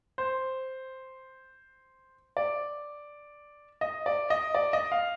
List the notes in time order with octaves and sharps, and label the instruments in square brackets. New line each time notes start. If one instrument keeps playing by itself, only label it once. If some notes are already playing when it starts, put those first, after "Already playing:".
[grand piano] C5
D5
D#5
D5
D#5
D5
D#5
F5